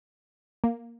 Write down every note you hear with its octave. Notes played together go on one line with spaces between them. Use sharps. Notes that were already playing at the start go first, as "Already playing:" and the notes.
A#3